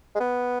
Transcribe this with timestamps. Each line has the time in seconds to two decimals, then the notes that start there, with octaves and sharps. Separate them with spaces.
0.15 G#3
0.20 B3